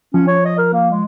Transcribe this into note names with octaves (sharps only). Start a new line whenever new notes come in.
F3 C#4
C#5
D#5
A#4
A#3
G#3